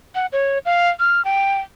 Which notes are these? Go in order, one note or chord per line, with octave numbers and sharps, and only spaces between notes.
F#5
C#5
F5
F6
G5